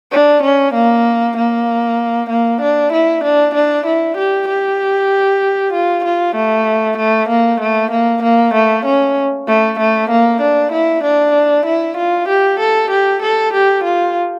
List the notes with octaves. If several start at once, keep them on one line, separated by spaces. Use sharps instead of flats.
D4
C#4
A#3
A#3
A#3
D4
E4
D4
D4
E4
G4
G4
F4
F4
A3
A3
A#3
A3
A#3
A#3
A3
C#4
A3
A3
A#3
D4
E4
D4
E4
F4
G4
A4
G4
A4
G4
F4